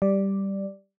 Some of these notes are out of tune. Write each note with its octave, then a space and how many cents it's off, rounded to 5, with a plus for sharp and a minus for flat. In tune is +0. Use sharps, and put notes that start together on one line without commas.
G3 +0 D5 +0